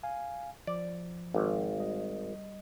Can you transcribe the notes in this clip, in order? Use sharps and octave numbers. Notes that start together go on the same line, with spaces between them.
F5 G#5
F3 D5
G#1
G3 D#5